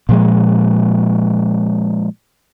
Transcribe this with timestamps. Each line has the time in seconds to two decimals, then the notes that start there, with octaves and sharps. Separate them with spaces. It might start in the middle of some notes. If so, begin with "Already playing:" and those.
0.09 A#2 F3 G#3